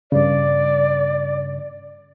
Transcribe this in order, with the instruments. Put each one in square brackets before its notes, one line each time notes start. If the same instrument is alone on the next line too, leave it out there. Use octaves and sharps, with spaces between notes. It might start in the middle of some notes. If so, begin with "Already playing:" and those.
[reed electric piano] G2 C#3 [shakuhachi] D5